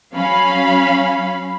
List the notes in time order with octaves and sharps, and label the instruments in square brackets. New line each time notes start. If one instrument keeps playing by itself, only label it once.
[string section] F#3 C#4 F5 B5